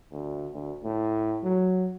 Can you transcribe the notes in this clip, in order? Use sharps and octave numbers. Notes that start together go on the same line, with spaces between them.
D2
D2
A2
F#3